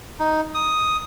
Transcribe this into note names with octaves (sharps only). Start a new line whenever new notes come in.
D#4
D#6